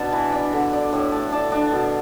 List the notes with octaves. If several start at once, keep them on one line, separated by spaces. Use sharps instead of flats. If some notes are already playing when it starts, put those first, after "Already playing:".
Already playing: B2 D4 A5
E3
D4 B5
D3
D4
A2
A3 A5
D4 A5
D4
B2